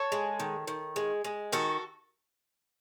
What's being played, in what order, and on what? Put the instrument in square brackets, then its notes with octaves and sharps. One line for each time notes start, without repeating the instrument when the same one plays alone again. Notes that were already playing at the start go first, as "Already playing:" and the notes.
Already playing: [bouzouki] A4 C#5
G#3
D#3
D#3
G#3
G#3
D#3 F#4 A4